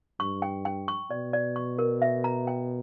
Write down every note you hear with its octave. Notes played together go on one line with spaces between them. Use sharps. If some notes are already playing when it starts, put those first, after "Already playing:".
G2 C#6
G5
G5
C#6
B2 D5
D5
C#6
A#4
E5
A#5
G5